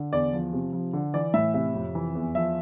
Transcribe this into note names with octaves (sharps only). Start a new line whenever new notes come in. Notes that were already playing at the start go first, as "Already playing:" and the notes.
Already playing: D3
E2 D5
F3
C3
F3
D3
E3 D5
A2 E5
C3 E5
F2
E3
E2
F3 E5